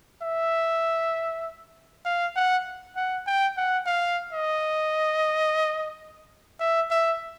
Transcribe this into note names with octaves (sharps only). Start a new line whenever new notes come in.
E5
F5
F#5
F#5
G5
F#5
F5
D#5
E5
E5